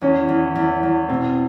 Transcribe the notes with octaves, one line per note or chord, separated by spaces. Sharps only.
E2 C#4
E2
E2
E2
B2 C4